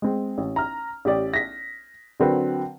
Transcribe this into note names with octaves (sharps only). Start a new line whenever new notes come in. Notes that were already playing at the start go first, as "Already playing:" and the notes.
G#3 C4
A1
A#5 F6
A1 G4 D5
A#6 B6
D3 F#3 C4 A#4 B4